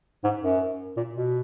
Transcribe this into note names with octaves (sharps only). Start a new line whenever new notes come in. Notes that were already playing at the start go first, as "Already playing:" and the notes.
G#2
F#2
A#2
B2